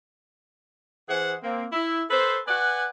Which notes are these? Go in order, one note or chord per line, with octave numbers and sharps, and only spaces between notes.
E3 G#4 C5 F#5
A#3 C4
E4
A4 B4 C5
B4 D5 F#5 G#5